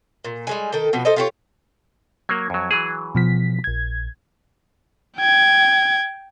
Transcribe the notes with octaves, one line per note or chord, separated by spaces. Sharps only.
A#2
G3 G#3 G#5
D#3 A4 G5
B2 F3 C4
A4 C5 D#5
F4 G4 C#5
F#3 A#3 G#6
F2 F#3
E3 F#3 G#4
B2 F3 B6
A#1 G#6
G5 G#6